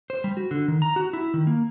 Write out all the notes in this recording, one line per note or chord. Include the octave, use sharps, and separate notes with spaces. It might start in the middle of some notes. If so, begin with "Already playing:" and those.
C5
G3
F#4
D3
D#3
A#5
F#4
E4
D#3
A#3